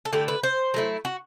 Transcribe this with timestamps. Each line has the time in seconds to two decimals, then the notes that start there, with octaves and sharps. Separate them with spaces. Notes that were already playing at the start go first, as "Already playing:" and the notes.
0.05 A4
0.13 D3 A3 E4 G4
0.28 B4
0.43 C5
0.74 F#3 A3 E4
1.05 F#4